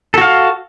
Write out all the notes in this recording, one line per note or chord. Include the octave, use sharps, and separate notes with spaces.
F#4 A4 F5